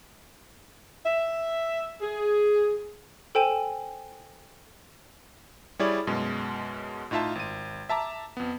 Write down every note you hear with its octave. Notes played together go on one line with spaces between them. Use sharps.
E5
G#4
A4 C5 G5 G#5 D#7 E7
G3 E4 G#4 C#5 D5
F#2 B2 G#3
A2 D#4 F4 E5 A5
G#1 D#7
E5 A5 A#5 D6
F2 B3